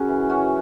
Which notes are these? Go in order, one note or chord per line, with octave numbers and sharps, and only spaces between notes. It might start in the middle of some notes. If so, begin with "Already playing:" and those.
Already playing: F#2 C#3 C#4 F#4
E3
F#2 C#4 F#4